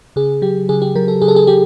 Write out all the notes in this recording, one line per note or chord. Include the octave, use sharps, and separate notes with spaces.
C#3 G#4
F#3 G4
C#3 G#4
G4
F#3 A#4
A4
C#3 G#4
A4
G#4
F#3 G4